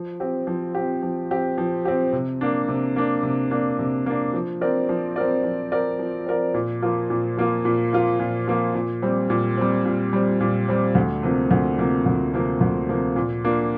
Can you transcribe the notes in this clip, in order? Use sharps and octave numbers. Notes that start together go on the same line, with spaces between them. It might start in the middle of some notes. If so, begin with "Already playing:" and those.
Already playing: F3
C4 G4
F3
C4 G4
F3
C4 G4
F3
C4 G4
C3
A#3 D4
C3
A#3 D4
C3
A#3 D4
C3
A#3 D4
F3
C4 A#4 D5
F3
C4 A#4 D5
F3
C4 A#4 D5
F3
C4 A#4 D5
A#2
F3 A#3 F4
A#2
F3 A#3 F4
A#2
F3 A#3 F4
A#2
F3 A#3 F4
A#2
G3 C4
A#2
G3 C4
A#2
G3 C4
A#2
G3 C4
D2
C3 F3 A#3
D2
C3 F3 A#3
D2
C3 F3 A#3
D2
C3 F3 A#3
A#2
A#3 D4 F4